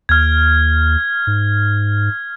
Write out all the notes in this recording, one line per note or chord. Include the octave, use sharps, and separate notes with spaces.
D#2 F6 G#6
G#2